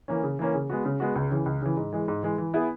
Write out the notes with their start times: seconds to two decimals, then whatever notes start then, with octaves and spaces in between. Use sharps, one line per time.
0.08 E3 A#3 C#4
0.23 C#3
0.39 E3 A#3 C#4
0.54 C#3
0.70 G#3 B3 F#4
0.85 C#3
1.00 G#3 B3 F#4
1.16 C#2
1.31 C#3 E3
1.46 C#2
1.62 C#3 E3
1.77 G#2
1.92 E3 G#3
2.08 G#2
2.23 E3 G#3
2.38 E3
2.54 B3 E4 G#4